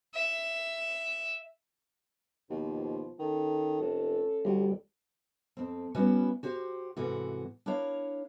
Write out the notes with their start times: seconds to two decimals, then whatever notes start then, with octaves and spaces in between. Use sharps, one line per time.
0.15 E5
2.50 D#2 B2 F3
3.19 D#3 A3 C#4 A4
3.80 F1
4.45 D2 G3
5.57 F2 C4
5.95 G3 B3 C#4 E4 F#4 B4
6.43 F#4 G4 C5
6.97 G#2 C3 E3 A3 F#4
7.66 D4 E4 A#4 C#5 F5